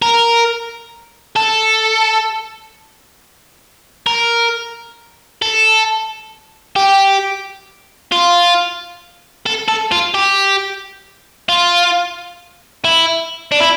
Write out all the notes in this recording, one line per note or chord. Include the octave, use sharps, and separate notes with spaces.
A#4
A4
A#4
A4
G4
F4
A4
A4
F4
G4
F4
E4
D4
E4